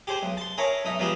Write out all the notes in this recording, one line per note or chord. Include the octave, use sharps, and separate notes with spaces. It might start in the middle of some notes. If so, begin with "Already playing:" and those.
G4 G#4 C5 G#5
B1
A5 C6
G#4 A#4 C#5 E5 A5
B1 D#4 E5
B2 F3 G3 G#4